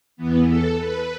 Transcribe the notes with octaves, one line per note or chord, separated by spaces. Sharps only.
E2 E3 B3
A4
B4